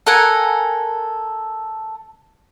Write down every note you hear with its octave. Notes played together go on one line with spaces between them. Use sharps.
A4 A#4 F#5 G#5